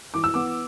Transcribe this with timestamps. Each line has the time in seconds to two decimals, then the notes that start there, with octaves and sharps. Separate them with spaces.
0.14 E3 D6
0.24 E6
0.34 B3 D6